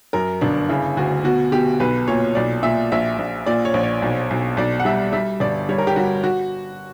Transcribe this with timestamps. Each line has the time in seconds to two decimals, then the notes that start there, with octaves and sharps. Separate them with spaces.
0.13 F#2 A#4
0.41 G1 D4
0.69 C#3 E4
0.97 D2 F#4
1.24 B2 F#4
1.52 B2 G4
1.80 B1 B4
2.08 A#2 C#5
2.35 B1 D5
2.63 A#2 E5
2.92 A#1 E5
3.18 A#1
3.46 A#2 D5
3.65 C#5
3.74 A#1
3.83 C#5
4.02 B1
4.30 B1
4.57 B1 D5
4.80 F#5
4.85 G3 E5
5.13 G3 E5
5.40 G1 D5
5.69 G3 C#5
5.78 A#4
5.87 G4
5.96 G3 F#4
6.24 F#4